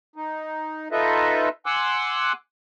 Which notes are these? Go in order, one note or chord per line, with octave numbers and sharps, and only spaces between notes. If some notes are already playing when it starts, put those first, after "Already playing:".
D#4
D#4 F4 A4 B4 D#5 E5
F#5 G#5 C6 D6 E6 F#6